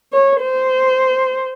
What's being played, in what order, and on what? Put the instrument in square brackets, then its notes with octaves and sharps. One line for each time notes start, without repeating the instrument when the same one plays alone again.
[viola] C#5
C5